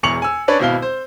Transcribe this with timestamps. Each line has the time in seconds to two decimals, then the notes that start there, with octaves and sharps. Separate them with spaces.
0.03 E1 E2 C#6 C#7 F7 F#7
0.22 G#5 E6
0.48 C#4 D4 B4 C#5 D5
0.60 G#1 B2 E4 F5 G7
0.82 C5